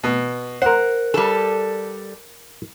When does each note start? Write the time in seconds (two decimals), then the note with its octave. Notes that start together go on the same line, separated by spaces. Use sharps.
0.04 B2
0.62 A#4 C5 F#5
1.14 G3 A4